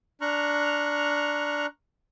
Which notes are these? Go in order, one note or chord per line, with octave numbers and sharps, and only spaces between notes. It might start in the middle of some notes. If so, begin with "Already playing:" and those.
D4 A#5 C#6 F6 F#6